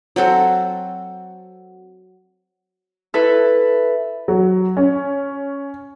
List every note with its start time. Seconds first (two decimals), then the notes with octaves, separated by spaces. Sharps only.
0.16 F#3 C4 F#4 A4
3.14 E4 A4 B4
4.28 F#3
4.77 C#4